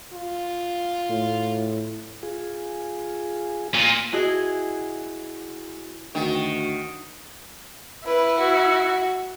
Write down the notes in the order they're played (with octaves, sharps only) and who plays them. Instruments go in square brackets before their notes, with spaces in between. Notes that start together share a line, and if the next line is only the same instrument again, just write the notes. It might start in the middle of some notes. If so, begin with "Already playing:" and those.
[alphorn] F4
[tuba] A2
[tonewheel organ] F4 G#4
[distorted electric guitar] A#2
[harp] E4 F#4 G#4 D#5 G#5
[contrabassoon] D2 [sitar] D#3 [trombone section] F#4
[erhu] E4 [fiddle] B4
[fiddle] F#4